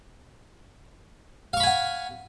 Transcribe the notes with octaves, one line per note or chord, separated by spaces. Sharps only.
F5 F#5 G#5 B5 C#6